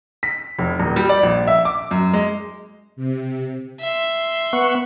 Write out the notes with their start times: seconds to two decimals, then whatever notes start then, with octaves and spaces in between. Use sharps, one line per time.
0.23 B6
0.59 F1
0.79 D#1
0.96 G3
1.09 D5
1.23 A#1
1.48 E5
1.65 D6
1.91 F#2
2.14 G#3
2.96 C3
3.80 E5 C6
4.53 B3 F#5 C#6